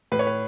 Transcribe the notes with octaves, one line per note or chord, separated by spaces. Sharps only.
A2 B4
C#5
B4